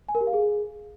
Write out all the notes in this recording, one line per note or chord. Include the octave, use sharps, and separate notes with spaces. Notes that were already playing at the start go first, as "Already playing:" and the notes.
G#5
A#4
G4
F5
G#4